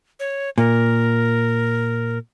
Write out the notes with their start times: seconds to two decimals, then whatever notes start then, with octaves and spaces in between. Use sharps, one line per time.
0.20 C#5
0.58 A#2 A#4